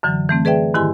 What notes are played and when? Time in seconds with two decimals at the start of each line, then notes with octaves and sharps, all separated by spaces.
0.03 F#2 D3 E3 F#3
0.29 E3 A3 C4
0.45 G#4 B4 D5 E5 G5
0.74 G#2 D#3 E4 G4 G#5 C6